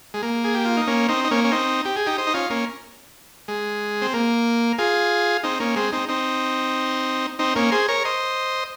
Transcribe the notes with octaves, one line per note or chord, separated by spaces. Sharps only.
G#3
A#3
G#4
G4
F4
D#4
A#3 C#4
C4 D#4
D#4
A#3 C#4
C#4
C4 D#4
G4
G#4
D#4 G4
C5 D#5
D#4
C#4 F4
A#3 C#4
G#3
C4
A#3
F4 G#4
C4 D#4
A#3 C#4
G#3 C4
C4 D#4
C4 D#4
C4 D#4
A#3 C#4
G#4 C5
A#4 C#5
C5 D#5